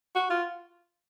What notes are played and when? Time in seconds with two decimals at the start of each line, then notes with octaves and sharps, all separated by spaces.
0.15 F#4
0.30 F4